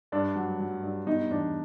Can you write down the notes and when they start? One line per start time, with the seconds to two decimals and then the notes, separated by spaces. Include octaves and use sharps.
0.12 G2 D4
0.36 F#3
0.60 F#3
0.83 G2
1.06 B2 D#4
1.30 E2 D4